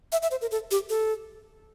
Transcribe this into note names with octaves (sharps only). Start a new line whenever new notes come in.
E5
E5
C5
A#4
A4
G4
A4